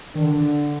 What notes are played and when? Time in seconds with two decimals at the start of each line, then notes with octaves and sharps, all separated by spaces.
0.15 D#3 D4
0.24 D3
0.35 D3